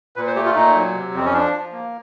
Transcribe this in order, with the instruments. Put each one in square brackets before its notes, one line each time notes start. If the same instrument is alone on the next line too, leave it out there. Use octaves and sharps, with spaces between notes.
[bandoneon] A#2 B4
C5
A3 G4
F4
A#2 D#4
F#3
C3
F2 C4
C#4
F3 D4
F3
A#3